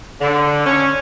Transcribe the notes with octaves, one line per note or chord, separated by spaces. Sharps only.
D3
C#4